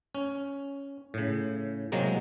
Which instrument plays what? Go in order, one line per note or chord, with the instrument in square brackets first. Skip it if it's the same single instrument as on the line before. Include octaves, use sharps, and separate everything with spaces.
[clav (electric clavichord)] C#4
A2 C#3
C3 F#3 G#3 A#3